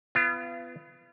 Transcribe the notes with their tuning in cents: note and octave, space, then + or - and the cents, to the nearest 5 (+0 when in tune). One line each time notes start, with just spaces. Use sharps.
B3 +25 F4 -35